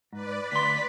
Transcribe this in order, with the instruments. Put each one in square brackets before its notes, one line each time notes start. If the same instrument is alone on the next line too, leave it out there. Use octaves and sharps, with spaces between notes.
[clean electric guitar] G#2 [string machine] B4 D5
[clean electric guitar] D2 C6 [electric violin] B6